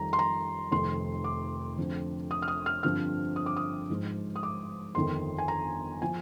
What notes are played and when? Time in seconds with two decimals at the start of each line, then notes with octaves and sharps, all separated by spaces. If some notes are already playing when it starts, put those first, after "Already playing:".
Already playing: F2 D#3 G3 A#5
0.13 C6
0.19 A#5
0.72 F1 F2 D#3 C6
1.24 D6
1.78 F2 D3 F3 C4
2.31 D#6
2.42 F6
2.48 D#6
2.66 F6
2.83 G2 D3 F3 C4 F6
3.36 D#6
3.46 D6
3.56 D#6
3.90 G#2 F3 G#3
4.36 D#6
4.43 D6
4.95 G1 F2 D#3 C6
5.38 G#5
5.48 A#5
6.02 F3 G#5